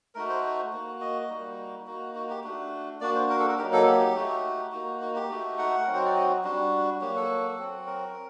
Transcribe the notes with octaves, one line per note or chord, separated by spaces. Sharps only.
A3 D#4 F#4 A#4
C5
A#3 F#4
D#5
G3 A#3 D#4 F#4
A#3 D#4 F#4
F#4
G4
A3 D4 F#4
A#3 D4 F#4 D5
C5
A#4
A4
A#4
F#3 A#3 D#4 G4
A4
G4
A3 D#4 F#4
A#3 D#4 F#4
F#4
G4
A3 D#4 F#4
F#5
F#3 C4 D#4 F#4 A#4
C5
D5
D#5
G3 D4 F#4
F#3 A#3 F#4 G4
A4
F#3 C4 F#4
A#4